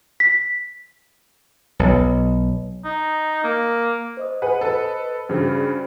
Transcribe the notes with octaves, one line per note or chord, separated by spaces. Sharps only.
B6
B1
D#4
A#3
C5 D#5 D#6
G#4 B4 F#5
A4 B4
G2 C#3 F#4 C5